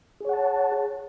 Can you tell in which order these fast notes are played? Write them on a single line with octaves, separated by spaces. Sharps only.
G#4 C#5 F#5 A5